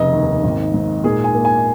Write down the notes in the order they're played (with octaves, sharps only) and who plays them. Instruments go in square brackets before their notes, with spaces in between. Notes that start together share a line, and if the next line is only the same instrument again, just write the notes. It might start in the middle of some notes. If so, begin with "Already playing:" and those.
Already playing: [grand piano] F1 C#3 D#5
D#2
G#1
G#2
A#2 G#4
G#5
A#3
G#5